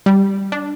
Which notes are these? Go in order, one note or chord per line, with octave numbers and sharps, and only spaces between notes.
G3
D4